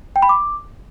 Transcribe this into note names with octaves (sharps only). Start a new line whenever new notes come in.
G5
B5
D6